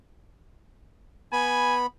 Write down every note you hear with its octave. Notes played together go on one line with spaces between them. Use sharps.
B3 G#5 B5